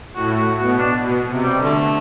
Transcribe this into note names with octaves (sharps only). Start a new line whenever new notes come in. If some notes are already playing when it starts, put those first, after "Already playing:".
A2 F#4
F#4
B2 F#4
D4
B2
C3
G3
D3
A3